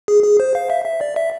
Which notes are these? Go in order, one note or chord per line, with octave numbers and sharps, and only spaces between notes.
G#4
G#4
C5
F5
E5
E5
D5
E5